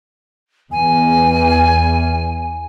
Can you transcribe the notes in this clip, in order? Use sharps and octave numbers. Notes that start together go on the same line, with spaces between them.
E2 G#5